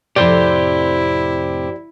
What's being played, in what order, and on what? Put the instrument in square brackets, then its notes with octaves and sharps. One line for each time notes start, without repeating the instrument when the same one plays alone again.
[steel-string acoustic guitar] F2 A2 C3 [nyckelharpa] E4 [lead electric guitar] G4 C5 [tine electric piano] D5